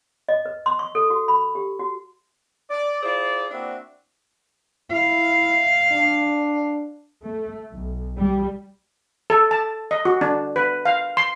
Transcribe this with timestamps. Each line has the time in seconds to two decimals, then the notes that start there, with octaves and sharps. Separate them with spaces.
0.29 D#5
0.46 B4
0.66 C6
0.79 C#6
0.95 A4
1.10 F#4
1.28 B5
1.55 G4
1.80 F#4
2.70 D5
3.02 E4 F4 G#4 C5 D5
3.51 A#3 C4 D4 E4 F#4 E5
4.92 E4 F5
5.91 D4
7.22 A3
7.72 B1
8.18 G3
9.30 A4
9.51 A5
9.91 D#5
10.05 F#4
10.21 D4
10.56 B4
10.85 F5
11.17 C6